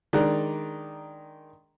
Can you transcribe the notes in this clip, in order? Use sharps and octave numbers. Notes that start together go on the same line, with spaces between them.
D#3 G#3 D4 D5 A#5 F#6